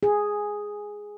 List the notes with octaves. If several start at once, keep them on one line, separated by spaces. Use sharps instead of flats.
G#4